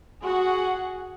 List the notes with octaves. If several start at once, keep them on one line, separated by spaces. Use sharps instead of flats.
F#4 G#4 F#5